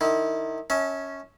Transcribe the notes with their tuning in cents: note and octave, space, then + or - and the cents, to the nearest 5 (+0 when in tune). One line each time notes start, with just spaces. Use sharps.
D#3 -25 E4 -35
C#4 +0 E5 -40 A5 +0